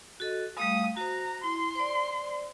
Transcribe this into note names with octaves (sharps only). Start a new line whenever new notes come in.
F#4 A4 D#5
G3 A3 F5 D#6
F#4 C5 A#5
E4 C6
C5 D5